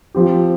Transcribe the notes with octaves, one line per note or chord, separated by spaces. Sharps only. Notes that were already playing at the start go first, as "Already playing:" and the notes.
F3 C4 G4